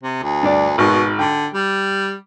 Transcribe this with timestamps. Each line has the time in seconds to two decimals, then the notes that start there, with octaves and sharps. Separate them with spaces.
0.04 C3
0.23 D2
0.43 G2 D4
0.78 G#1 G#2 B2
1.19 D3 G5
1.54 G3